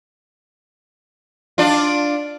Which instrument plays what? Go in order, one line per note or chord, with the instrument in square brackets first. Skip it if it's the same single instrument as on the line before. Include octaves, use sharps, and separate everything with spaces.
[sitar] D4 F4